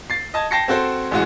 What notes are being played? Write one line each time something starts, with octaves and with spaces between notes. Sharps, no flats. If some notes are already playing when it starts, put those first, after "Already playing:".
A6 C7
D#5 A5 G#6
G5 A5 A#6 C7 C#7
C4 F#4 A4 C5
A1 E3 G#3 F#4